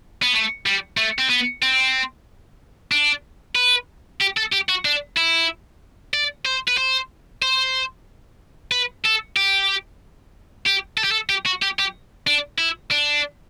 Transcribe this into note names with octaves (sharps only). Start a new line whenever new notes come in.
B3
A3
G3
A3
C4
B3
C4
D4
B4
G4
A4
G4
F#4
D4
E4
D5
C5
B4
C5
C5
B4
A4
G4
G4
A4
G4
A4
G4
F#4
G4
G4
D4
E4
D4